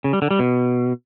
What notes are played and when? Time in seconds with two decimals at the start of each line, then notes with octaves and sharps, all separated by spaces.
0.04 C#3
0.13 G3
0.22 D3
0.31 G3
0.39 B2